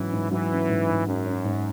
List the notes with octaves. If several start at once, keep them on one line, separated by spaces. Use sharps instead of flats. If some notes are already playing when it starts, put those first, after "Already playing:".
Already playing: G#2 E3 F#3 C#4
G#2
E3 F#3
C#4
G#2
G#2
F#2 C#4
C#4
G#2